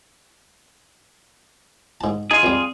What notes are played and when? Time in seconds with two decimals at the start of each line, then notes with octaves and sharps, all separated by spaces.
2.01 G#2 A5
2.31 D#4 F4 G#4
2.43 F2 G3